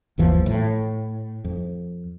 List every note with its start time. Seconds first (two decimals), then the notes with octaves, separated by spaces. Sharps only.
0.18 G1 D#2 E3 F3
0.46 A2
1.44 F2